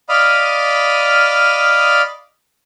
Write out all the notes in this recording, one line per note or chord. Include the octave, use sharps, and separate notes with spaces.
D5 D#5 F5 B5 D#6 F6